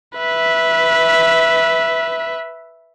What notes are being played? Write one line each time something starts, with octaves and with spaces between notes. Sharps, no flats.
B4 E5